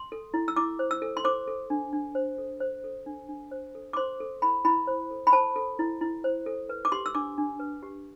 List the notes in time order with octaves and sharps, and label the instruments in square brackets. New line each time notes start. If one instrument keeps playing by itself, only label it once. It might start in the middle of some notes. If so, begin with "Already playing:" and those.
Already playing: [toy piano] C6
A4
E4
E6
E4 D6
C5
E6
A4
C6
C5 D6
A4
D4
D4
C5
A4
C5
A4
D4
D4
C5
A4
D6
C5 C6
A4
E4 B5
E4 B5
C5
A4
B5
C5 A5
A4
E4
E4
C5
A4
B4
D6
G4 C6
E6
D4 D6
D4
B4
G4